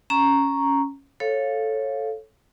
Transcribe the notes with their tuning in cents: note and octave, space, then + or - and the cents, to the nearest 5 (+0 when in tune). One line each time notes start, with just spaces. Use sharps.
C#4 +0 A#5 +0 C#6 +0
A4 +0 C#5 -15 F5 +0